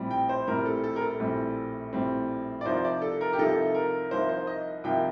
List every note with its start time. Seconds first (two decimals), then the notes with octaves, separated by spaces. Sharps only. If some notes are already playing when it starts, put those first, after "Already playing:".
Already playing: A#1 A2 G3 C4
0.11 G5
0.29 C5
0.48 A#1 A2 G3 C4 A#4
0.66 A4
0.84 A4
0.96 A#4
1.01 A4
1.20 A#1 A2 G3 C4
1.93 A#1 A2 G3 C4
2.61 D5
2.66 C2 C3 F3 A#3 D#4 C5
2.85 D5
3.02 A4
3.21 A#4
3.33 G4
3.38 C2 C3 F3 A#3 D#4 A4
3.75 A#4
4.11 C2 C3 F3 A#3 D#4 C5
4.29 C5
4.47 D#5
4.84 C2 C3 F3 A#3 D#4 G5